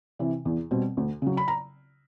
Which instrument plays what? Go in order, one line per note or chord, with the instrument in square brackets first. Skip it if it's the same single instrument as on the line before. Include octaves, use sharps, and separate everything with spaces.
[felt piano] C3 E3
E2
B2 G3 C4
D2
C#3 F#3
B5
A#5